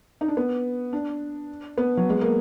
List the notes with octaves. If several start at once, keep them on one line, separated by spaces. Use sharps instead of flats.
D#4
D4
B3
D4
B3
F#3
G#3
A#3